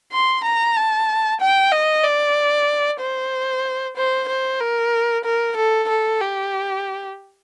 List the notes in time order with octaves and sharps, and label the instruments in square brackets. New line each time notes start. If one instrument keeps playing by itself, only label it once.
[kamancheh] C6
A#5
A5
G5
D#5
D5
C5
C5
C5
A#4
A#4
A4
A4
G4